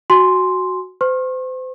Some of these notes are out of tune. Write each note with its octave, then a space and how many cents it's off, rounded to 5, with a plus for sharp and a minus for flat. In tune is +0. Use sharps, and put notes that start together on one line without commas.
F#4 +0 G#5 +0 C6 +0
C5 -35 C#6 -45